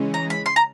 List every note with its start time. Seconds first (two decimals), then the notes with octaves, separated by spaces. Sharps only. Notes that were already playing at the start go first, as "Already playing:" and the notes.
Already playing: C#3 E3 G#3 C#4
0.14 A#5
0.30 B5
0.46 C6
0.56 A#5